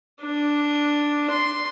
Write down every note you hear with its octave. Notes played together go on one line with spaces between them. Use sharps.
D4
C6